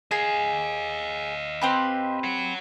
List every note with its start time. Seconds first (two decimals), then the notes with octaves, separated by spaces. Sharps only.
0.11 G#4 D#5 F5
1.61 C4 G4 B4
2.24 C#5 F#5